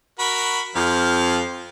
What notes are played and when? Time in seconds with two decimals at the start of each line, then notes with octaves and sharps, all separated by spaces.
0.19 F#4 A#4 B5
0.76 F2 F3 F5